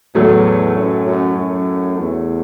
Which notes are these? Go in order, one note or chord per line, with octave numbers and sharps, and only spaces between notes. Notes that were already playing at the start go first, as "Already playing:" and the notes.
E2 A2 F#3 A3
F#2
F#2
F#2
E2